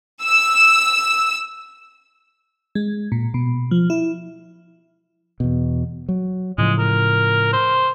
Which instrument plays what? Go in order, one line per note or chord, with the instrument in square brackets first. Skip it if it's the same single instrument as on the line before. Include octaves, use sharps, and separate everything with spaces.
[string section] E6
[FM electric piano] G#3
A#2
B2
F3
E4
[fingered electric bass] E2 B2
F#3
[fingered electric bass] A2 C#3 F3 [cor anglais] G#3
[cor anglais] A#4
C5